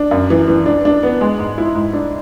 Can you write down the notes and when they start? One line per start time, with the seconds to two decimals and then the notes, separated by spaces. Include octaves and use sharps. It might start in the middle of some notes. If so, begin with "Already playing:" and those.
Already playing: D4
0.11 F#2
0.30 E3
0.47 E3
0.66 D4
0.85 D4
1.03 B3
1.21 G#3
1.39 G#2
1.58 E4
1.75 G#2
1.93 D4